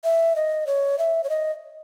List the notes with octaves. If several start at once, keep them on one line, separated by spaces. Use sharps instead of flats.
E5
D#5
C#5
E5
C#5
D#5